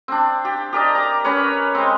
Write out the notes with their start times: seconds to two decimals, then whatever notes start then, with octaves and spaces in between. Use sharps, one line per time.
0.08 C4 D4
0.45 G4
0.73 G4 A#4 D5 D#5
0.95 A#5
1.24 C#4 A#4 B4 C#5
1.75 G#3 C4